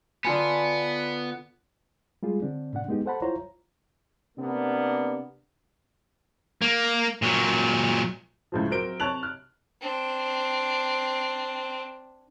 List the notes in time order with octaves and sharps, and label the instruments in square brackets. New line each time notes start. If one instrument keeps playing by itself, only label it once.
[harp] D3 F4 G#5 [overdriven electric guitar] B3
[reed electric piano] G3 G#3 F4 G#4
D3 C4 D4
A2 C3 D4 F#5
G#3 B3 D#4 G4
A4 C5 F#5 A5 B5
E4 F4 C5 C#5 A#5
[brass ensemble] C3 A#3 B3 D4
[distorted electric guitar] A#3
A#2 F#3
[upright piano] C#2 A2 F3
F#3 C4 A#4 D7 G7
C3 C#5 A5 F#6 F7 F#7
F6 F#6
[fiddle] C4 D4